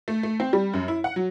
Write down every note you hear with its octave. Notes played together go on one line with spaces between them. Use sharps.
A3
A3
C4
G3
F#2
E4
F#5
F#3